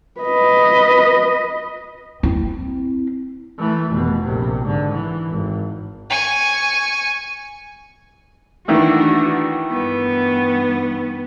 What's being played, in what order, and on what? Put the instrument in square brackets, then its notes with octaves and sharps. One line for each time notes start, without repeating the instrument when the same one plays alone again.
[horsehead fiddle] B4 D#5
[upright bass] C4 E4
[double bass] E3 A3
F1 B2
A#1 C3
G#2 D3
E3
G#1
[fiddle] G#5 C#6
[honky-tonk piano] D#3 E3 A3 [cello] D4 F#4
[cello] G2 B3